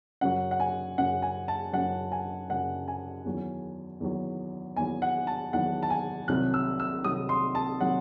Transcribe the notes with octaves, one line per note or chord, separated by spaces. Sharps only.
F#2 C#3 F#3 F#5
F#5
G#5
F#2 C#3 F#3 F#5
G#5
A5
F#2 C#3 F#3 F#5
G#5
F#2 C#3 F#3 F#5
G#5
E2 D#3 F#3
E2 D#3 F#3
E2 D#3 F#3 G#5
F#5
A5
E2 D#3 F#3 F#5
A5
G#5
C2 C3 D#3 F#3 F#6
E6
E6
C2 C3 D#3 F#3 D#6
C6
A5
C3 D#3 F#3 F#5